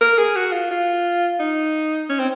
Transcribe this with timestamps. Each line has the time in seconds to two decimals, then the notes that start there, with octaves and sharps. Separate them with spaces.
0.01 A#4
0.18 G#4
0.36 F#4
0.52 F4
0.71 F4
1.40 D#4
2.10 C#4
2.20 C4